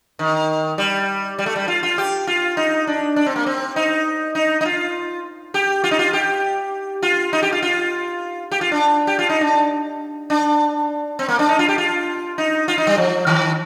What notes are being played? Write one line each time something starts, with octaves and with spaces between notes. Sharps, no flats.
D#3
G3
G3
A3
G3
F4
F4
G4
F4
D#4
D4
D4
C4
A#3
C4
D#4
D#4
D#4
F4
G4
F4
D#4
F4
G4
F4
D#4
G4
F4
F4
G4
F4
D4
G4
F4
D#4
D4
D4
C4
A#3
D4
D#4
F4
G4
F4
D#4
F4
D#4
G3
F3
D#3